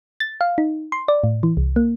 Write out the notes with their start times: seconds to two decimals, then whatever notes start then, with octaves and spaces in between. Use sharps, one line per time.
0.20 A6
0.41 F5
0.58 D#4
0.92 C6
1.08 D5
1.24 A2
1.43 E3
1.57 C2
1.76 A#3